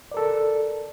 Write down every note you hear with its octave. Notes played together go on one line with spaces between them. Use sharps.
A4 A#4 D5